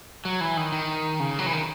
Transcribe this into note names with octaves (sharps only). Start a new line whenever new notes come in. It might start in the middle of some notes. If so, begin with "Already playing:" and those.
F#3
E3
D#3
D#3
C#3
F#3
E3
D#3